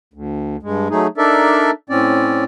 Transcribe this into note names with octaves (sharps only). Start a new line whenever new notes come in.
D2
G2 G#3
F#3 A3 D#4 G#4
D4 D#4 A4 A#4 D5 E5
A2 C4 C#4 D5